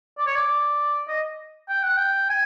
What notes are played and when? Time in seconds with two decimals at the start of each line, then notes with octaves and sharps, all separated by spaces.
0.18 D5
0.27 C#5
0.36 D5
1.08 D#5
1.69 G5
1.83 F#5
1.97 G5
2.30 G#5